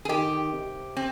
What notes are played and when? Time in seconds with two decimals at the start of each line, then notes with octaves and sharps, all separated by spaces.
0.05 G#4
0.09 D#3 G4
0.52 C3
0.97 C4